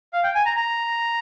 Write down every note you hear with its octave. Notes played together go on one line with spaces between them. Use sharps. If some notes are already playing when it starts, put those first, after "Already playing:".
F5
G5
G#5
A#5
A#5